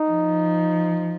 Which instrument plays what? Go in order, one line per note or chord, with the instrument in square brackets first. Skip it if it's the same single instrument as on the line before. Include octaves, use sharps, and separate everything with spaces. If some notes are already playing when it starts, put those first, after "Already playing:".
Already playing: [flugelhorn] D#4
[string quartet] F3